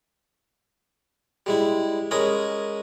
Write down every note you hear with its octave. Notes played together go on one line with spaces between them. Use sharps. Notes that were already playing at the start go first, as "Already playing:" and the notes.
G3 G#3 E4
G#3 C#4 A#4 G#5 B5 D#6